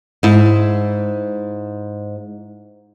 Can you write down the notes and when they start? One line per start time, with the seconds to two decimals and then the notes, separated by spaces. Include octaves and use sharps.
0.23 G#2 E4